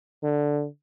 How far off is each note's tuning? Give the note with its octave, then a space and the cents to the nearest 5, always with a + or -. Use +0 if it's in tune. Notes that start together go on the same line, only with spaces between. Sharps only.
D3 +0